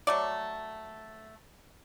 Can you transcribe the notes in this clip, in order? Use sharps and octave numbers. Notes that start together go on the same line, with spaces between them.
F#3 A3 D5